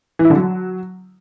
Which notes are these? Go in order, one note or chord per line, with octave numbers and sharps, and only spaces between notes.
E3
E4
D3
F#3